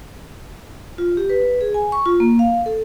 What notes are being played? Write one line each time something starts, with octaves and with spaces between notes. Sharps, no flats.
F4
G4
B4
G#4
G#5
C#6
F4
A#3
F5
A4